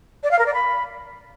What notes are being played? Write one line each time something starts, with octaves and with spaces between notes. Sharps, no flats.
D5
F5
A#4
D5
B5